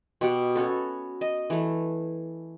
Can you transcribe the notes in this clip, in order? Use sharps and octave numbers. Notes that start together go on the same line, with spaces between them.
B2 G4 F#5
B3 C#4 F#4 A4
D#5
E3 A3